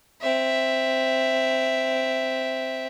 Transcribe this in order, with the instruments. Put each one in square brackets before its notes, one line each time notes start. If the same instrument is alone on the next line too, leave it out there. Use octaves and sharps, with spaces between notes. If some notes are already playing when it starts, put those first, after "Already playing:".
[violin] C4 E5